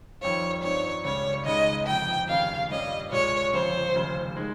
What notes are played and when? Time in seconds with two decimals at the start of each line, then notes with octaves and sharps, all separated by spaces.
0.21 F2 D#3 G3 C4 F4 C#5
0.63 G2 F3 C4 D#4 C#5
1.05 C#2 C#3 G3 C#5
1.45 C#2 C#3 G#3 D#4 D#5
1.87 G1 F2 C3 G5
2.28 F1 D#2 C#3 F5
2.70 G2 G3 C#4 F4 D#5
3.12 C2 A#2 G#3 C#5
3.52 G1 F2 C#3 F3 C5
3.95 F1 D#2 C#3
4.37 D#3 G#3